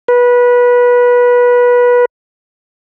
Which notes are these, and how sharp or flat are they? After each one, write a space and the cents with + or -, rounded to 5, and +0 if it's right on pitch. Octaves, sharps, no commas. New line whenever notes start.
B4 -20